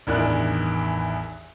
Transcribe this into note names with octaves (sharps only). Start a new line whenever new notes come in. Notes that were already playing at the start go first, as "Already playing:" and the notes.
A1 E2 G2 D#3 D5 F#6